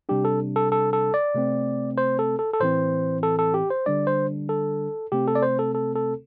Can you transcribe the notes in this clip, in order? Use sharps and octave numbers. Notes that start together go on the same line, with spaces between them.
C3 G3 D4 G4
A4
A4
A4
A4
D5
C3 A3 C4
C5
A4
A4
A4
A2 E3 C4 C5
A4
A4
G4
C5
D3 G3 D4 D5
C5
A4
C3 A3 C4 G4
A4
D5
C5
A4
A4
A4